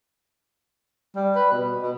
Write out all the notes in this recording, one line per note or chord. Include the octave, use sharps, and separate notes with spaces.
G3
B4
B2
B2